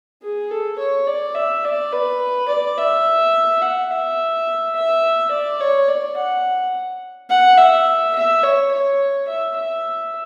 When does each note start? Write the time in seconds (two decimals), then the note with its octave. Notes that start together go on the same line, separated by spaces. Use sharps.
0.22 G#4
0.51 A4
0.78 C#5
1.07 D5
1.35 E5
1.64 D5
1.92 B4
2.48 D5
2.77 E5
3.61 F#5
3.91 E5
4.76 E5
5.31 D5
5.61 C#5
5.88 D5
6.17 F#5
7.30 F#5
7.58 E5
8.15 E5
8.43 C#5
8.71 C#5
9.28 E5
9.56 E5